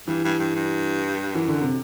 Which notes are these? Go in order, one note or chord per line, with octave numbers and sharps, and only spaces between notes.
G2 E3
G2
G2
G2
F#2 E3
D3
C3